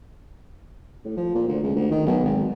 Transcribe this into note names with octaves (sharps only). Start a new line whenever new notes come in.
A2
F3
A#2
D2
C#2
D2
D#3
B1
G#1